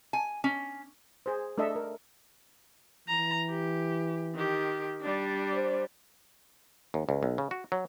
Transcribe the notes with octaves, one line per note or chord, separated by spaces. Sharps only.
G#5
C#4
G#4 C5
A3 D4 A4 D#5 E5
A#4
E3 A#5
G4
D#3 G4
G3 D4
C5
D#2
C#2
B1
C#3
F#4
F#3